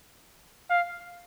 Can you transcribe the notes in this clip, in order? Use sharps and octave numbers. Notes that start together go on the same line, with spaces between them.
F5